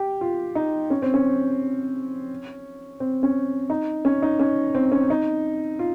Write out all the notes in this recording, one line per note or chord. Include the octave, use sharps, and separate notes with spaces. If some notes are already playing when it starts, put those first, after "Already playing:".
Already playing: G4
F4
D#4
C#4
C4
C#4
C4
C#4
D#4
C#4
D#4
C#4
C4
C#4
D#4
F4